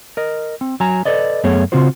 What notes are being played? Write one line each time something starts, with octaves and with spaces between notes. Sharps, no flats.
A#4 D#5
C4
F#3 G#5 A#5
A4 B4 D5 D#5
F#2 A3 B3 G#4 C#5
C#3 C4 F4 F#4 C5